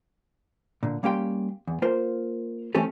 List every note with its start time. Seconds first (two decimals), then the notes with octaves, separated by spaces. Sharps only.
0.83 A#2 D3
1.03 G3 A#3 C#4 G4 G5 C6
1.67 E2
1.82 A#3 F4 A#4 C5
2.75 E3 A3 C4 C#4 G4 A4